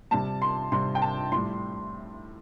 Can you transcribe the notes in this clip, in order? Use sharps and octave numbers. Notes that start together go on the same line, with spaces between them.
C3 G3 A5
C6
C3 G3 C6
G5
A5
A2 G3 C6